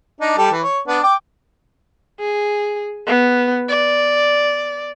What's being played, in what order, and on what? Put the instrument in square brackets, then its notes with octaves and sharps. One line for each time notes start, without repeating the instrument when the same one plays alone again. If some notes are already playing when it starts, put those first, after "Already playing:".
[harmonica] D4 D#4
G3 G4 A4
E3
C#5
B3 D4
G5 D6
[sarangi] G#4
B3
D5